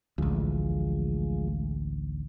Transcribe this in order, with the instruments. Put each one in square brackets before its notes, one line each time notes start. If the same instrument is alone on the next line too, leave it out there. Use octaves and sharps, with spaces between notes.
[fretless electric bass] A1 D2 [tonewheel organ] F3 G#3